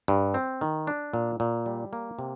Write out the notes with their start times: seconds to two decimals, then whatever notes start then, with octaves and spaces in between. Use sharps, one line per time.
0.08 G2
0.34 C4
0.61 D#3
0.87 D4
1.13 A#2
1.40 A#2
1.66 G3
1.93 A#3
2.19 C3